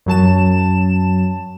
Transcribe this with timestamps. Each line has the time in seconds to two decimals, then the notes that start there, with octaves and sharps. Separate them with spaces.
0.06 F#2 F#3 A5 E7